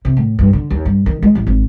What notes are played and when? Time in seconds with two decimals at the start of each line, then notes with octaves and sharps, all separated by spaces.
0.05 C3
0.17 A2
0.39 G2
0.53 D3
0.70 D#2
0.85 G2
1.06 D#3
1.23 G#3
1.35 A1
1.47 G#1